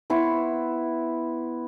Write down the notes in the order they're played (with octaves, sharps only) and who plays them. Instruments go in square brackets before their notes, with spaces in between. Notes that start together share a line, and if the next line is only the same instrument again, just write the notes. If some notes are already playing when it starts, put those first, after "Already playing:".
[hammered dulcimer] B3 E4 C6 C#6